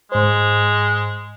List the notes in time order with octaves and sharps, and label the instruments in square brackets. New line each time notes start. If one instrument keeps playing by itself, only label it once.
[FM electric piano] G#2 C5 [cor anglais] G#3